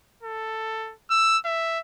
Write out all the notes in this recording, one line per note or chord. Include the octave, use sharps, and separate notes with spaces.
A4
E6
E5